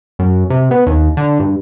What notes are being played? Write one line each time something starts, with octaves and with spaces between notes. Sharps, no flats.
F#2
C3
B3
D#2
D3
G2